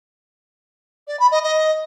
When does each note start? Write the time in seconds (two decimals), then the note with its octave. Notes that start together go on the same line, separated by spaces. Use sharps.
1.08 D5
1.20 B5
1.31 D#5
1.43 D#5